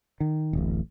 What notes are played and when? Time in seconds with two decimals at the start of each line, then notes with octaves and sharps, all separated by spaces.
0.20 D#3
0.53 D1 A1